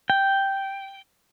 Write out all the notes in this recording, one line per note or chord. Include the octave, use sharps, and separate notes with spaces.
G5